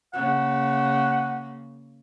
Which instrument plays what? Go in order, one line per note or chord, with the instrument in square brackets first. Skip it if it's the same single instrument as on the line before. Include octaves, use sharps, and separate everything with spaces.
[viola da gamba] C#3 A#3 [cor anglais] F#5